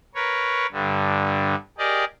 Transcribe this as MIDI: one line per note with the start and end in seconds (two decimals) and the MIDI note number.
0.15 0.66 70
0.15 0.66 71
0.15 0.66 73
0.72 1.55 43
0.72 1.55 50
1.78 2.05 67
1.78 2.05 68
1.78 2.05 70
1.78 2.05 74
1.78 2.05 75